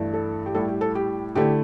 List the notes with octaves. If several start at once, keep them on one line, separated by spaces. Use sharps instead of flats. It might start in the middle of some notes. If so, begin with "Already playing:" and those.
Already playing: G2 E3 A3 E4
A4
G4
A2 G3 E4 A4
G4
A4
G4
D3 A3 E4 G4